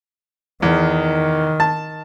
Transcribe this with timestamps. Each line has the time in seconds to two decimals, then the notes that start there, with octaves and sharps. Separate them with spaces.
0.62 E2 D#3
1.60 A5